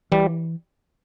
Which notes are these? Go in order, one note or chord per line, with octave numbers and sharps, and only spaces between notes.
E3 G3